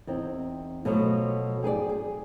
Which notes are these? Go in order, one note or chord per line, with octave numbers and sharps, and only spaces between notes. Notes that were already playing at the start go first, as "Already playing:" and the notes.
E2 C4 D#4
B2 F3 F#3 A3
G4 G#4 B4 D5
G#4